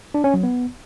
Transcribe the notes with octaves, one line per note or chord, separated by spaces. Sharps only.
D4
C#4
F#3
B3